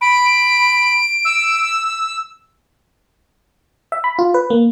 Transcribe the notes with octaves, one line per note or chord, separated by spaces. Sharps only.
B5 D7
E6
E5
B5
F4
B4
A#3